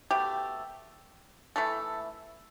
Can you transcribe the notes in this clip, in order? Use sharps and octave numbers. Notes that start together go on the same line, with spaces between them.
B2 A3 G4
E3 A3 A4